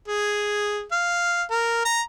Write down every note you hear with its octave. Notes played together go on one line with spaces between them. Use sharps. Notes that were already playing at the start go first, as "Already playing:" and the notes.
G#4
F5
A#4
A#5